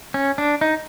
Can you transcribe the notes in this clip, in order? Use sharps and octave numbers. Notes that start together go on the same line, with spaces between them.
C#4
D4
D#4